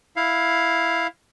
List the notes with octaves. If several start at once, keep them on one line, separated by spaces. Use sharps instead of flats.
E4 F5